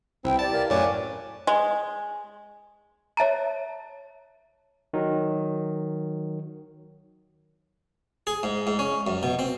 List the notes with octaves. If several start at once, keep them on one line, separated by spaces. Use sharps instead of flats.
C2 C4 E4 B4 G5
G4 D5 A5
A#4 F5 G#5
F#2 A2 B4 C#5 D5 G#5 A5
G#3
C#5 E5 A5 A#5
D#3 F#3
G#4
G#2
G#2
C#4
F#2
B2
C4